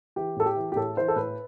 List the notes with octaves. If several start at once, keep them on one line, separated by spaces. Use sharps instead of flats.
E3 G4
A2 A4
G4
E3
G4
A2 A4
E3 C5
A4
A2 B4